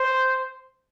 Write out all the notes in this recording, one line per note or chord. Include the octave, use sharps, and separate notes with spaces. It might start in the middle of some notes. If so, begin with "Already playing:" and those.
Already playing: C5